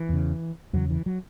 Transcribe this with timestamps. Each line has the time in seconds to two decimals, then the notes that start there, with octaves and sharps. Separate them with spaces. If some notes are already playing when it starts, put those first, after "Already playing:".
Already playing: E3
0.09 E2 C#3
0.73 E2 C#3 F#3
0.90 E3
1.06 F#3